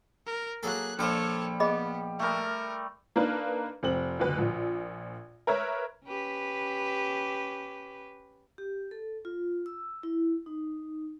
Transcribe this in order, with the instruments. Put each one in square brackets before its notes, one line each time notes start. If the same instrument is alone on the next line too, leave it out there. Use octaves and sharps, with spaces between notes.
[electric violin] A#4
[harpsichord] F#3 A#3 A4 [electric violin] G#4 F#6
[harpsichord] A#1 C5 [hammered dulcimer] G3 [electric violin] A4 C#5
[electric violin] B3 [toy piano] G#4 D#5 B5
[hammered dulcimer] G3 A3 [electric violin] A#4
[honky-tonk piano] A#3 D4 D#4 A#4 B4
F1 C4 F#7
F#1 D2 B4
A#1 A#2
A#4 B4 C#5 E5 A#5
[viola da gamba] C#4 G4 B4
[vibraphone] G4
A4
F4
E6
E4
D#4